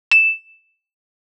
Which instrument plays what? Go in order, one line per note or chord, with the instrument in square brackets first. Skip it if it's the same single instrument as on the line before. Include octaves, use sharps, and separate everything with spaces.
[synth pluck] E7